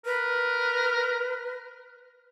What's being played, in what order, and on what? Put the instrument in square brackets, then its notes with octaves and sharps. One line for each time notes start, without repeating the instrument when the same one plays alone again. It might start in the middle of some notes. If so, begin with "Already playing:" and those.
[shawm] A#4 [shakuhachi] B4